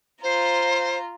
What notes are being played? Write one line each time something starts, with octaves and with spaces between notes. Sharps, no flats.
F4 C5 A#5